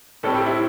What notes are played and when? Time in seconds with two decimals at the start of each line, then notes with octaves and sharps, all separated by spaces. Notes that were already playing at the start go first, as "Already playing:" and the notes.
0.23 A2 G3 C4 A4
0.35 G4
0.46 E4